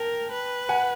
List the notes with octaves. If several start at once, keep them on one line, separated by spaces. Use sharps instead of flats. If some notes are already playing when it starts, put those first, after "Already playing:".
Already playing: A#4 G5 A5
B4
F#5 G#5